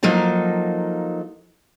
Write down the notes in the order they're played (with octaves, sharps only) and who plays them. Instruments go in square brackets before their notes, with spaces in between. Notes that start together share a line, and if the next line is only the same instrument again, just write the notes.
[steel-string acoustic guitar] F3 F#3 A#3 D#4 A4